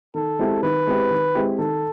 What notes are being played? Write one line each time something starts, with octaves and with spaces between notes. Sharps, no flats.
D#3 A4
G#3 C4 E4 G4
D#3 B4
G#3 C4 E4 G4
D#3
G#3 C4 E4 G4
D#3 A4